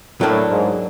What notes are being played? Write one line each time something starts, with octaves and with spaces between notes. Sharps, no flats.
A2 F#3 A#3 D4
G#2